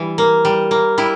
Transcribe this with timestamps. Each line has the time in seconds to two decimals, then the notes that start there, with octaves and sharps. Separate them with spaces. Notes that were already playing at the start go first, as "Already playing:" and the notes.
Already playing: E3 G3
0.18 A#3
0.45 G3
0.71 A#3
0.98 G3 E4